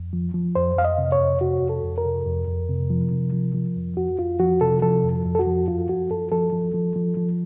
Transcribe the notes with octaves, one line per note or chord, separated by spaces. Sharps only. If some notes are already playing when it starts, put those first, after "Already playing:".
Already playing: F2
F3
F3
F2 C5
F2 F5
D#5
C3
C#5
F2
C3 F#4
F2
A4
F2
A#4
C3
F2
F2
C3
F3
C3
F3
F3
F2
F2 F#4
F2 F4
F3 F#4
C3 A4
F3 A4
F2
F2
A4
F#4
F3
F#2 F4
F3 F#4
F#2 A4
F3 A4
F3
F3
F3
F3